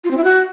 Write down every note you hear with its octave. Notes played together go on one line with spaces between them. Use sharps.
F4
C4
E4
F#4